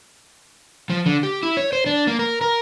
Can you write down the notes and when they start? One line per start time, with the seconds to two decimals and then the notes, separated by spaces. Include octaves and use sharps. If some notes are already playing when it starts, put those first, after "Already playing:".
0.90 F3
1.06 D3
1.23 G4
1.43 E4
1.57 C#5
1.73 C5
1.86 D4
2.07 A#3
2.19 A#4
2.41 A#4